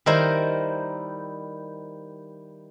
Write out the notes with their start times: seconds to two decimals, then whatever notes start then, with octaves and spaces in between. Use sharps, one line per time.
0.06 D#3 G3 E4 A#4 C5